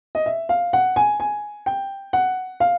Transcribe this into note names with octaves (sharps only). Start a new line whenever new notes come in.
D#5
E5
F5
F#5
G#5
G#5
G5
F#5
F5